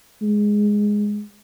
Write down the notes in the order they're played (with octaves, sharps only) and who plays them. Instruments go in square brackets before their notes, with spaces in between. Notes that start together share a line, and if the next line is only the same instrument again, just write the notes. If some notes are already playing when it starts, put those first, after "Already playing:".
[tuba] G#3